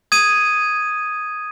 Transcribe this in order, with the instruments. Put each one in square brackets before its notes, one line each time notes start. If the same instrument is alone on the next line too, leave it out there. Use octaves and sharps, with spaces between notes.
[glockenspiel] D#6 G#6 D#7